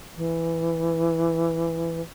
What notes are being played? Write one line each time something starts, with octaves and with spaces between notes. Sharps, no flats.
E3